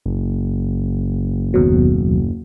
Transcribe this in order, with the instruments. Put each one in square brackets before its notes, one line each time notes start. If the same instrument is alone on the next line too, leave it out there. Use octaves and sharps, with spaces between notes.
[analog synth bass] F#1
[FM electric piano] D#2 B2 F#3